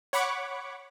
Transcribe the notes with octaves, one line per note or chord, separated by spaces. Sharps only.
C#5 F#5 B5 C#6 D6